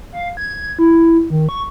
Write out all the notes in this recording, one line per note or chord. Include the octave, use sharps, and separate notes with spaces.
F5
G#6
E4
D#3
C#6